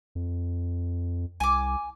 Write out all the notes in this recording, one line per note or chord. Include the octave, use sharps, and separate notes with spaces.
F2
C2 G#5 D6